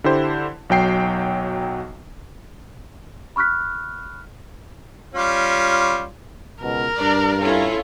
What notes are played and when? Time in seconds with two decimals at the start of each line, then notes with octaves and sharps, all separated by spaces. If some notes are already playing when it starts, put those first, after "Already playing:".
0.04 D3 E4 G4 C5
0.70 B1 F#3 G5 C7
3.36 B5 C#6 F6 F#6 B6
5.14 G3 C#4 F4
6.62 C#2 B2 A#4
6.98 G2 D4 D5
7.41 C#4 E4 F4 A4